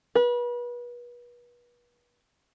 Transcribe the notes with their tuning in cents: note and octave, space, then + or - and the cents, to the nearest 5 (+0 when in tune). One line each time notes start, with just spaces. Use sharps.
B4 -35